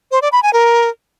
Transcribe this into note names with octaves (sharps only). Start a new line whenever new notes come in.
C5
D5
B5
G#5
A#4